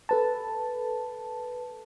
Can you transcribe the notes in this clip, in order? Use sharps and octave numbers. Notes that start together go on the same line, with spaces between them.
A4 B4 A5